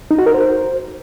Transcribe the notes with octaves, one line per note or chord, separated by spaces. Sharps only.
D#4
F#4
A#4
C5